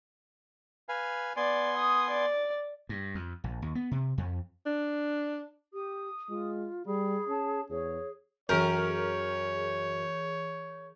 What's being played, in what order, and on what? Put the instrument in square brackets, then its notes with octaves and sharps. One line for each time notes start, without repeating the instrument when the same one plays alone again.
[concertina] B4 F5 G#5
[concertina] B3 G#5 C6 [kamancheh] D5
[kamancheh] D#6
D5
[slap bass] G2
F2
A#1
D#2
B3
C3
F2
[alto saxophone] D4
[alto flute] G4 [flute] D#6
[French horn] G#3 [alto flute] F4
[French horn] G3 [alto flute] G#4 [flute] B5
[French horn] C#4 [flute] A5
[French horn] E2 [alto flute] G#4 [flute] C#5
[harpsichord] F#2 [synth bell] E3 G#4 G6 [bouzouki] A#4 [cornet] C#5